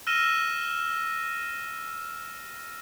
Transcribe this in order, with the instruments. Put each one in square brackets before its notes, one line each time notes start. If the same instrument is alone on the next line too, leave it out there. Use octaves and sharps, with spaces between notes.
[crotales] E6 F6 A#6 D#7 E7 G7